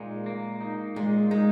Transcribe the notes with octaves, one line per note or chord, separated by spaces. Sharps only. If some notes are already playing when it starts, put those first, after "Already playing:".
Already playing: A#2 G#3 D#4
A#3
D#4
A#2 G#3
G#3 D#4